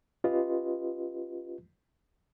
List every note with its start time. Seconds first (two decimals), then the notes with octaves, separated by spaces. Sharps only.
0.24 C#4 F4 G4 B4 D#5